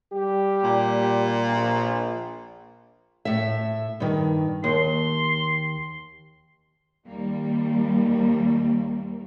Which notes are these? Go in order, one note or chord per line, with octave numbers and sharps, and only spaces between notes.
G3 G4
A#2
A#1
A2 E5
G2 D#3
D#2 C6
D#2 G3 A#3